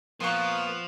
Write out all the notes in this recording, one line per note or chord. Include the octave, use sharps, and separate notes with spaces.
A#2 F3 A#3 B3 C6 C#6